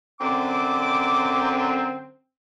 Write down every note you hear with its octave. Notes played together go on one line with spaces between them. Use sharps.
F#2 D3 C4 D6